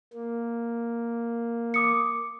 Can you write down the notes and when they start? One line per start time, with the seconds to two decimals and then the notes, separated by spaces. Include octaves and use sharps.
0.13 A#3
1.74 D6 D#6 C#7